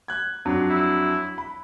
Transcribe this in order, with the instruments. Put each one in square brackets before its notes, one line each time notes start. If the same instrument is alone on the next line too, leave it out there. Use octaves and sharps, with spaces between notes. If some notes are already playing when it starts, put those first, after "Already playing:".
[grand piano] F#6 G#6
F2 F#3 D4
[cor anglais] E4
[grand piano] B5